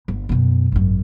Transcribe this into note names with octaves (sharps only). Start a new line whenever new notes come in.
G1
F#2 B2
G#1 F#2